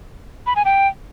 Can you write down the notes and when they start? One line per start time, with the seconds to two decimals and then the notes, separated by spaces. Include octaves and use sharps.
0.47 B5
0.56 G#5
0.65 G5